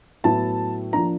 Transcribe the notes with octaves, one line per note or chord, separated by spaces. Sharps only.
A2 F#3 B3 E4 A5
F3 A#3 D4 A#5